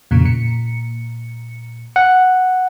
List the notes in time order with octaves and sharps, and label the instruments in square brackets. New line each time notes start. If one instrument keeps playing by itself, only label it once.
[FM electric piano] F2 A#2 C#3
A#2 C#7
[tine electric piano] F#5